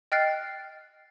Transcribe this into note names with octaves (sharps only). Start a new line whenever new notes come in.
D#5 G5 F6 F#6 A6 C7